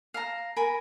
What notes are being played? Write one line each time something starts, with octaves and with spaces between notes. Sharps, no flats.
F5 A5 A#5
A#4 G#5 B5